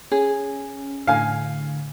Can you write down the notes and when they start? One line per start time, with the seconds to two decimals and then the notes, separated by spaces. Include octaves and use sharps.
0.12 C#4 G#4
1.07 A2 D3 F5 G#5